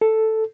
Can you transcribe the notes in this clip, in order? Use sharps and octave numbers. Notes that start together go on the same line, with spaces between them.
A4